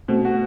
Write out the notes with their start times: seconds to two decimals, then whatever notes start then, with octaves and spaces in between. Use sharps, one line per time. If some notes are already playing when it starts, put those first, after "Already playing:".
0.08 B2 A3 C4
0.25 F#4